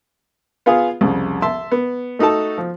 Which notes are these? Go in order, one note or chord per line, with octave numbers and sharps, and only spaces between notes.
B3 F4 G#4 F5
C2 F2 C#3
E5 A5 C6 E6
B3
A3 D#4 F#4 A4 A5
F3